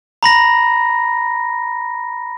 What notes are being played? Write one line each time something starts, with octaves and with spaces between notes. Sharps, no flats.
A#5 B5 A#6